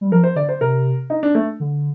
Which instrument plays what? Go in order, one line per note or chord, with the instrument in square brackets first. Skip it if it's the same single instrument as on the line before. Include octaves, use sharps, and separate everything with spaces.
[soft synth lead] G3
[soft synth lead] F3 [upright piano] A#4
[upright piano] C5
[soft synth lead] D3 [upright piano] D5
[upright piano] C5
[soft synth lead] C3 [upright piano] A#4
[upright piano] D#4
D4
A3
[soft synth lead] D3